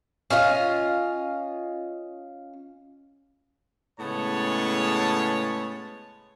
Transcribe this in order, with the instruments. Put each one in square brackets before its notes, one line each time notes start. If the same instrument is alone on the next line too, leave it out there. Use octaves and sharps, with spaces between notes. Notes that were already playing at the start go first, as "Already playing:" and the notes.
[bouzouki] C#4 F4 D#5 F5
[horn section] A2 C#3 G#3 B3 C#5 A5